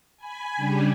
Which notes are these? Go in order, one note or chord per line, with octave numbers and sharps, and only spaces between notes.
G#5 B5
C#3 G3 D4 G4